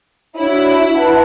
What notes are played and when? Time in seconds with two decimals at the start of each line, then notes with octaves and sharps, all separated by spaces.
0.36 D4 E4 F#4 C#5 E5
0.94 B4 F#5 A5